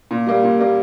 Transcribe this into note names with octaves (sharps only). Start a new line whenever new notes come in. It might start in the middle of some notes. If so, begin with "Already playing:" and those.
A#2
G3 A#3
A#2
G3 A#3